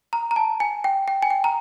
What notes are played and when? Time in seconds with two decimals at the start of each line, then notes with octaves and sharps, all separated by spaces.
0.13 A#5
0.31 A#5
0.36 A5
0.60 G#5
0.84 G5
1.08 G5
1.22 G#5
1.30 G5
1.44 A#5